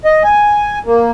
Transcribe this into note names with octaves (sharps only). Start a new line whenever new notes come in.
D#5
G#5
A#3